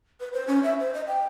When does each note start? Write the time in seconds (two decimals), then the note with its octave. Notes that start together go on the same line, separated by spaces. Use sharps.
0.20 B4
0.33 C5
0.47 C#4
0.63 E5
0.80 C5
0.94 D#5
1.07 G5